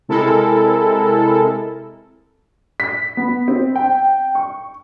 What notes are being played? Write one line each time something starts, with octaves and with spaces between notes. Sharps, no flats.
C3 G#3 E4 A4 A#4
B6
B3
C4
G5
C#6